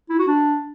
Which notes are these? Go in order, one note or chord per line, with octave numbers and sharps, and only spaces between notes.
E4
F#4
D4